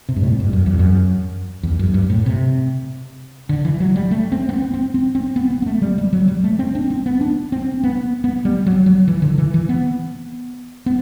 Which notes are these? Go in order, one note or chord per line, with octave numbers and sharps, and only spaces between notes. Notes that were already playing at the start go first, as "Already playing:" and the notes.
C3
G2
A2
G2
F#2
E2
F#2
E2
F#2
G2
A2
C3
D3
E3
F#3
G3
A3
C4
B3
C4
C4
C4
C4
B3
B3
B3
A3
G3
G3
F#3
G3
A3
C4
D4
C4
B3
D4
C4
B3
B3
G3
F#3
F#3
E3
D3
E3
E3
B3
B3